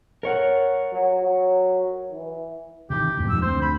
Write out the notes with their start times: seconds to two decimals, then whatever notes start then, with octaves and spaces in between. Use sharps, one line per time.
0.23 A#4 C#5 F#5
0.93 F#3
1.22 F#3
2.11 E3
2.90 C3 D#3 E3 G4
3.17 A1 G2 B2
3.29 F2 G#2 D#3 E6
3.42 D2 C4 C5
3.62 B5